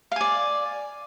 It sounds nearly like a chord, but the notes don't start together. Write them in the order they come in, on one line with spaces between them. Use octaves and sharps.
F5 G#5 D5